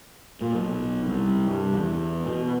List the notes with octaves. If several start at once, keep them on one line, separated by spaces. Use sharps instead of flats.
A#2
B1
C2
G2
E2
B2